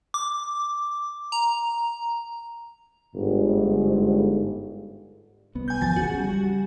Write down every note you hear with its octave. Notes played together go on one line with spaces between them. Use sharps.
D6
A#5
G1 G#2
C2 B3
G#5 G6
G#1 E2 F3 G#5 A6
C#3 F#4
G3